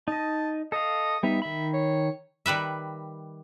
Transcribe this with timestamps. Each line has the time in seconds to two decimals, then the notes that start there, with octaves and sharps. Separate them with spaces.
0.08 D#4 D#5 A5
0.72 A4 D#5 F5
1.23 G3 B3 D#4 E5
1.42 D#3 E5 B5
1.73 C#5
2.46 D#3 G3 B4 E5